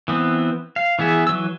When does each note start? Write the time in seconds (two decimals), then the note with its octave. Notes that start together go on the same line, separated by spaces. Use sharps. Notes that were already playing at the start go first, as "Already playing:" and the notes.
0.08 E3 B3 C4
0.76 F5
0.99 E3 B3 G#4 E5
1.27 E3 F#3 E6